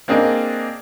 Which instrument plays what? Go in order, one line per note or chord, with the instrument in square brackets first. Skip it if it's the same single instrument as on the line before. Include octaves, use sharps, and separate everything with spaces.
[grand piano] A#3 C4 D4 G#4 A#4 D#5